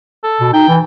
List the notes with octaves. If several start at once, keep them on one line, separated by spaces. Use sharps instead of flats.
A4
B2
D#4 G5
E3